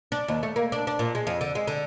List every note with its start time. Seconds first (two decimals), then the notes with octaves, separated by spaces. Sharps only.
0.12 D4
0.28 D#2
0.43 A3
0.56 A#3
0.72 D4
0.87 D4
0.99 A#2
1.15 G#3
1.27 F2
1.41 D3
1.55 G#3
1.67 D3